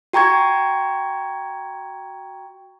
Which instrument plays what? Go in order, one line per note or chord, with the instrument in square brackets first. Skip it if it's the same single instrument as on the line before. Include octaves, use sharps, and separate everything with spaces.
[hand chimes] F#4 G5 A#5 C#6 G#6